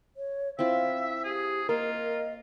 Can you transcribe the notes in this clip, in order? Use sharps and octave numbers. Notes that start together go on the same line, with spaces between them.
C#5
C4 E4 F4 E5 F5
G4 G#4
A#3 F4 A#4 D#5